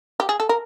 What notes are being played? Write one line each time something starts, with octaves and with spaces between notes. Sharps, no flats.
G4
G#4
A4
A#4